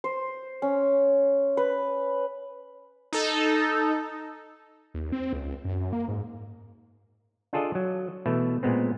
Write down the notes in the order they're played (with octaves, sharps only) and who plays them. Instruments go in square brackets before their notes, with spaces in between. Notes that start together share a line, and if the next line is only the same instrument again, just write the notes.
[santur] C5
C#4
B4
[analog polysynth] D#4 A4
[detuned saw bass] D#2
C4
C#2
F#2
A#3
G#2
[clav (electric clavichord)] D4 F4 G#4 A4 D5 D#5
F#3
B2 E3 A3 E5
A#2 G#3 B3 C4